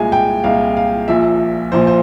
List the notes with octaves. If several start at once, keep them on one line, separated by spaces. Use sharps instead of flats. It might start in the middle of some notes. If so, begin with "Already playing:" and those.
Already playing: C2 A#2 G#3 G#5
G5
C2 A#2 G#3 F5
F5
A#1 A#2 F3 E5
A#1 A#2 F3 C5
C5